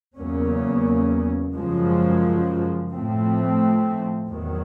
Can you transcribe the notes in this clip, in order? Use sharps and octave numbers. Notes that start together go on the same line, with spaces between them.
E2 C#3 F#3 A#3 C#4
F#2 C#3 F3 G#3
A2 F3 A3 C4
E2 C3 D#3 F#3